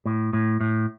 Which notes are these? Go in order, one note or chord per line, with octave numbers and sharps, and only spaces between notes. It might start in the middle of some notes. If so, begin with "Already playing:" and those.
A2
A2
A2